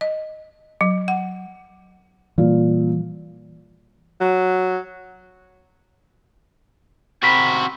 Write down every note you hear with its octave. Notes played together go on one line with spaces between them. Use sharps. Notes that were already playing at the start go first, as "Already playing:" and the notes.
D#5
F#3
F#5
A#2 E3 G3 F4
F#3
C3 C4 F#4 A#4 B5